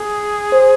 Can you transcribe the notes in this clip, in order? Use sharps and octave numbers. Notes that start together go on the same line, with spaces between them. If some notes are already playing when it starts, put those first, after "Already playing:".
Already playing: G#4
C5